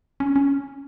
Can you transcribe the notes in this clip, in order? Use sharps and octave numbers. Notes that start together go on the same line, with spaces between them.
C#4
C#4